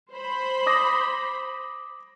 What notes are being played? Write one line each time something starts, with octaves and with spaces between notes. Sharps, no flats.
C5 B5
D6 D#6 A#6